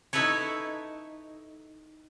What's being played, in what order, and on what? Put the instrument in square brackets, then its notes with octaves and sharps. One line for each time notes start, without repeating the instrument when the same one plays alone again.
[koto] D#4 E4 A4 B4 C#5